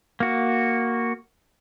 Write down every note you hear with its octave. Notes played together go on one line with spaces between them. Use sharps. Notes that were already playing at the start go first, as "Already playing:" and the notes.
A#3 F#4